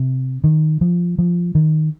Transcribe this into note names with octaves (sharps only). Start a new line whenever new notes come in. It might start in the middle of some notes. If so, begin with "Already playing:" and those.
Already playing: C3
D#3
F3
F3
D#3